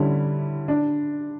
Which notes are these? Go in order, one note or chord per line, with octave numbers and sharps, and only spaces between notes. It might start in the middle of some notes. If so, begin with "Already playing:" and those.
Already playing: D3 G3 C#4 E4
D4